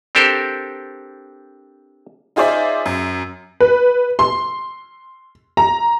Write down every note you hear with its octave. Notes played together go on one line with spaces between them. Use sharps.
C4 D4 G4 A4 A#4 C5
D#4 F4 G#4 C5 D5 E5
F#2
B4
C6
A#5